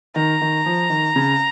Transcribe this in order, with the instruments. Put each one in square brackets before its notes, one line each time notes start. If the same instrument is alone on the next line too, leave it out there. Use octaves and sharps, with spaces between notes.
[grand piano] D#3 [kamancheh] A#5
[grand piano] D#3
F3
D#3
C#3